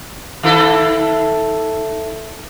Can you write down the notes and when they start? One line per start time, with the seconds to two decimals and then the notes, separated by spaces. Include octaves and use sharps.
0.43 D#3 E4 A4